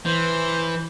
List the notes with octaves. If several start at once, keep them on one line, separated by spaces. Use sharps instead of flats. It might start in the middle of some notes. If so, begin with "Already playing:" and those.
E3 C5